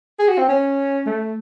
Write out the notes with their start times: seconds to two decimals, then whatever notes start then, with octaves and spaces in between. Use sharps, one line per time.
0.19 G#4
0.29 F#4
0.38 C4
0.49 C#4
1.07 A3